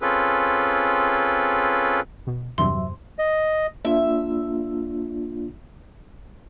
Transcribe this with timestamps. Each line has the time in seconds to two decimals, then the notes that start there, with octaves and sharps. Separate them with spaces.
0.01 C4 C#4 F4 G#4 A4 B4
2.27 B2
2.58 E2 G2 C3 F#3 E5 C6
3.19 D#5
3.85 A#3 D4 F4 E5